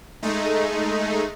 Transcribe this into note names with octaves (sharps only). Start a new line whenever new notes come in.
G#3 A3 D#4